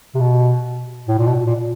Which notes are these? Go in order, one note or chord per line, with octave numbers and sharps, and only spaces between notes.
C3
B2
A2
A#2
B2
A#2